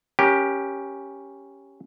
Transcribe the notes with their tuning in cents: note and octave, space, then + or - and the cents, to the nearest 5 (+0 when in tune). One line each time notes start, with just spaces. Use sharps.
C#4 +0 G4 +0 A#4 +35